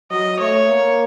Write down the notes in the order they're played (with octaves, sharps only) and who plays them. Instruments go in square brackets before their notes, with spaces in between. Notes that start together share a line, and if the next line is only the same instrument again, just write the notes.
[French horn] F#3 [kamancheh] D#5
[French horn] A3 [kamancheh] C#5
[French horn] A#3